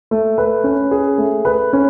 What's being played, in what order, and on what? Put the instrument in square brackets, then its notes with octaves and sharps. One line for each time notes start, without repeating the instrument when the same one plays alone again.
[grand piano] A3
B4
C#4
G#4
A3
B4
C#4